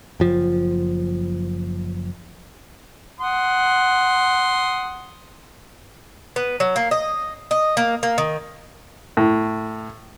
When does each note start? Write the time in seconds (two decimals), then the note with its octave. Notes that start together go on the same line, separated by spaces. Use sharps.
0.20 F#1 F3
3.20 F#5 C6 D#6
6.36 B3
6.60 F#3
6.76 A#3
6.91 D#5
7.51 D#5
7.77 A#3
8.03 A#3
8.18 D#3
9.17 A2